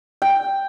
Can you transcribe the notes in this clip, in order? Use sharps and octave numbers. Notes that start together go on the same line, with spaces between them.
G5